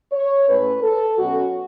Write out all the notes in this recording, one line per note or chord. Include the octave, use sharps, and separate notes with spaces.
C#5
A2 G#3 C#4 B4
A4
B2 F#3 C#4 F#4